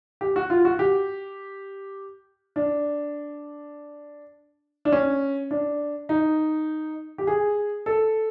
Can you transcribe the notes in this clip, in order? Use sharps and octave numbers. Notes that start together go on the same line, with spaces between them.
G4
F#4
F4
F#4
G4
D4
D4
C#4
D4
D#4
G4
G#4
A4